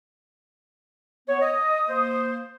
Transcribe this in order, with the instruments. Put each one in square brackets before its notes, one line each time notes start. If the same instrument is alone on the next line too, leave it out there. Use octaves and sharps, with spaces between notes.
[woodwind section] B3 C#5
[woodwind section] D#5 [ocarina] D#6
[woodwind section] A#3 C5